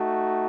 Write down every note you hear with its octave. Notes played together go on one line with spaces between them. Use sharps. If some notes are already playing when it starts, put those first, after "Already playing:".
Already playing: A3 D#4 F#4